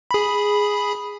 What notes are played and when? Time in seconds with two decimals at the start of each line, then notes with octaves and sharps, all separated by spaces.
0.11 G#4 B5